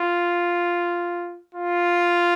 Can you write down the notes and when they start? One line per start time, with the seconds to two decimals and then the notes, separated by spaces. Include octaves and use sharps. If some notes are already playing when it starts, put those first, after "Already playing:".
Already playing: F4
1.55 F4